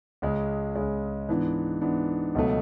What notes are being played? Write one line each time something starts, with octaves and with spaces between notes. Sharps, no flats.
C#2 C#3 G#3
C#2 C#3 G#3
G#2 E3 B3 D4
G#2 E3 B3 D4
C#2 B2 F#3 A3